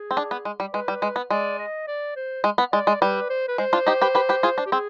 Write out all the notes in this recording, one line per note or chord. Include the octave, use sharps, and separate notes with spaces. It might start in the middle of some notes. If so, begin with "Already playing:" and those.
Already playing: G#4
C4
D4
B3
G#3
G3
G#3 B4
G3
G#3
B3
G#3 D5
D#5
D5
C5
G#3
B3
G#3 D5
G#3
G3 B4
C5
B4
G#3 C5
D4 F4
D#4 G4
G4 B4
G4 B4
G4 B4
F4 G#4
D4
G4
C4 G#4